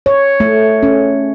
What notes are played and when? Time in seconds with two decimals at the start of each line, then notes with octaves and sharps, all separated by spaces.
0.06 C#5
0.40 A3
0.83 C#4